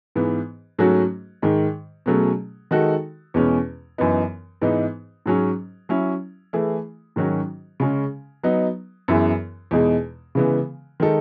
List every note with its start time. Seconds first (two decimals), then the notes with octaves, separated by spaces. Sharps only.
0.15 G#2 E3 B3
0.78 G#2 F#3 A3 C#4 F#4
1.42 G#2 D#3 G#3
2.06 B2 F#3 A3 C#4 G#4
2.71 D#3 G#3 D#4 F#4 A4
3.34 E2 B2 G#3 C#4
3.98 F#2 E3 B3 D#4
4.61 G#2 E3 B3 D#4
5.26 G#2 F#3 C#4 G#4
5.89 F#3 C#4 E4
6.53 E3 A3 E4 G#4
7.16 G#2 D#3 F#3 C#4 F#4
7.80 C#3 G#3 C#4
8.43 F#3 B3 D#4
9.08 F#2 E3 B3 E4 G#4
9.71 E2 B2 G#3 D#4 G#4
10.35 C#3 E3 G#3 B3
11.00 D#3 G#3 D#4 A4